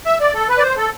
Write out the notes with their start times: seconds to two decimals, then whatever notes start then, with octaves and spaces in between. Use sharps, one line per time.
0.06 E5
0.20 D5
0.35 A4
0.49 B4
0.58 D5
0.62 C5
0.77 A4